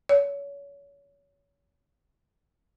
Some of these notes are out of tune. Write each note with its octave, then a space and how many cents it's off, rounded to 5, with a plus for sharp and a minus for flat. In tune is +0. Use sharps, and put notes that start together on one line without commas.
C#5 +30